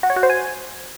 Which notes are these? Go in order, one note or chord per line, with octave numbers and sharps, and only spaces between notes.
F#4
C#5
F#4
C5
G#5